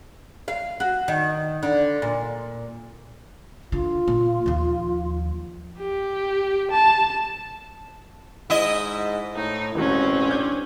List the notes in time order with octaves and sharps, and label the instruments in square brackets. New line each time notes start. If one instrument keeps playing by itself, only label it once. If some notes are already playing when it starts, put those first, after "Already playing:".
[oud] F5
F#4
D#3
D3
A#2
[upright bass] D3 [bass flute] F4
[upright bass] A#2
D#2 F3
[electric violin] G4
A5
[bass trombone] G#2 [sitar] E4 D#5
[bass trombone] A2 [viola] D#4
[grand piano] E1 E3 F#4 [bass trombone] A1 [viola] C4 C#4
[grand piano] D4 G6